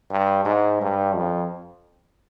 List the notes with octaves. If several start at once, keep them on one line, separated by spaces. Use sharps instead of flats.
G2
G#2
G2
F2